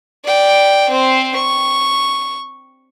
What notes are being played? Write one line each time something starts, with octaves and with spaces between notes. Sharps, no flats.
D5 G5
C4 C5
C#6